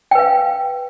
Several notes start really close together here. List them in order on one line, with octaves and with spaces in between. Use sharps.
G5 B4 F5